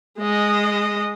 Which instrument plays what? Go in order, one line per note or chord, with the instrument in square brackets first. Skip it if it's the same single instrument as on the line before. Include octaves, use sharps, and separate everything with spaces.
[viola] G#3 D#5